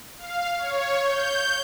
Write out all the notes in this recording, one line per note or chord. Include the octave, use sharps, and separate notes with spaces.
F5
C#5
G6